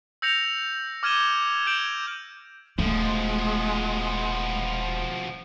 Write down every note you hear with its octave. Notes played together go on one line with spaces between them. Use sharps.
E6 G6 A#6 C#7 F7
D6 F6 G#6 D#7 E7 G7
G6 G#6 D7 E7 F#7 G7
D#1 B2 F3 G#3 A3